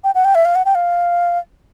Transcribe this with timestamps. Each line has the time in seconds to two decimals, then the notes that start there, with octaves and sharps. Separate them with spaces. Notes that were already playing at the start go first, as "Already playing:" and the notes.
0.04 G5
0.15 F#5
0.25 G5
0.35 E5
0.45 F5
0.55 F#5
0.65 G5
0.75 F5